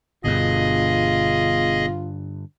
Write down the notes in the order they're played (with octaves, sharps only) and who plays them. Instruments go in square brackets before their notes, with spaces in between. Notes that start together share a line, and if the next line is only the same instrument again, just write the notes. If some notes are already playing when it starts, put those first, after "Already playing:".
[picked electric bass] G1 B2 [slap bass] G2 D3 [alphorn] F4 [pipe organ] G#4 D#5